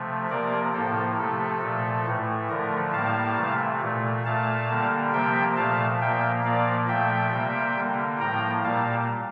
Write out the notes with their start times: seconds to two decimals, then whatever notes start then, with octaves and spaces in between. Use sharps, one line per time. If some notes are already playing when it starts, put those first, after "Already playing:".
Already playing: C3 F3 A3
0.29 C3 F3 A#3 A#4 D5
0.73 A2 F3 A#3 A4 C5
1.18 C3 F3 A3 A4
1.62 A#2 F3 A3
2.05 A2 E3 A3
2.49 D3 F3 A3 A#4
2.93 A2 G3 A#3 F5 A5
3.37 C3 E3 A3
3.81 A#2 A3
4.25 A#2 A3 F5 A5
4.69 D3 G3 A#3
5.13 C3 F3 A#3 E5 G5
5.56 A#2 F3 A3 F5 A5
6.01 A#2 F3 A#3 E5 G5
6.44 A#2 F3 A#3 D5 F5
6.88 A#2 F3 A3 E5 G5
7.32 C3 G3 A#3
7.76 D3 G3 A#3
8.20 A2 F3 A#3 G5 A#5
8.64 A#2 G3 A#3 F5 A5